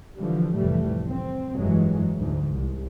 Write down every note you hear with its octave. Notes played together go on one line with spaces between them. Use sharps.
D3 E3 F3 G3
F1 C2 A2 E3 G3 A3
C4
F1 G2 E3 F#3 G#3
D2 G#2
C2